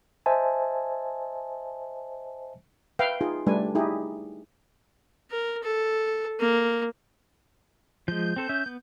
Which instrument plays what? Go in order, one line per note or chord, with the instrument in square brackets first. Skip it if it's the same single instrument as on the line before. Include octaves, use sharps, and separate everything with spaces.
[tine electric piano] C5 D#5 E5 G#5 A5
[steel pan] B4 E5 F5 G5
D#4 F4 G#4
G3 A3 D4 B4 G#5
D#4 E4 G4 G#4
[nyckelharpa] A#4
A4
A#3
[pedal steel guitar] F3 G#3 [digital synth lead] G6
[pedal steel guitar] C4 A4 C5
C#4 E5
B3